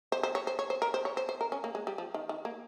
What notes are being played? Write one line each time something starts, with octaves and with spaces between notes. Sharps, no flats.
C5
C5
C#5
C5
C#5
C5
A#4
C5
C#5
C5
C5
A#4
C#4
A#3
G#3
G3
F3
D#3
D#3
A#3